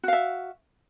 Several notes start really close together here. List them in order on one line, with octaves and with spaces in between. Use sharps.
F#4 F5 E5